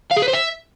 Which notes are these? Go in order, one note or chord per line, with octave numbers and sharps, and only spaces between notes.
F5
G#4
B4
C5
E5